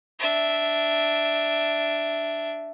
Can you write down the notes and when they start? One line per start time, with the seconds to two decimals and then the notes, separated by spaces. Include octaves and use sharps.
0.19 D4 E5